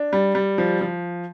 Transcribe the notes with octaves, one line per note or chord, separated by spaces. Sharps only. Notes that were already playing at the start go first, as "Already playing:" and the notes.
Already playing: D4
G3
G3
F3
F3